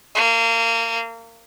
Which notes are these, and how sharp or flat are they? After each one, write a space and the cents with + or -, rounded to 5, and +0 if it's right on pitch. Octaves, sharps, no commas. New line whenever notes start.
A#3 -30